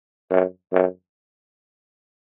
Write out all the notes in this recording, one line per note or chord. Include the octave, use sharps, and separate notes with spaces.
F#2
F#2